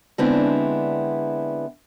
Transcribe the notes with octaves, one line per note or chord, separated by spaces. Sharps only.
D3 G#3 B3 C4 D4 E4